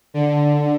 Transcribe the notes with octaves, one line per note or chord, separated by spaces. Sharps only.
D3